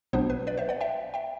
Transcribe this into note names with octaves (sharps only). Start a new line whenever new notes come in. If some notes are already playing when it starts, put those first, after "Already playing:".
B1 B2 F#3 B3 D4 C5
B4
B4 D5
C5 E5
D5 F#5
E5 G5
E5 G5